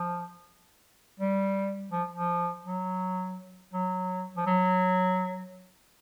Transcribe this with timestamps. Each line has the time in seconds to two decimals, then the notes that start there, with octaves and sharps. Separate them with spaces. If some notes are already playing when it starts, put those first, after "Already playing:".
Already playing: F3
1.20 G3
1.92 F3
2.14 F3
2.65 F#3
3.74 F#3
4.37 F3
4.46 F#3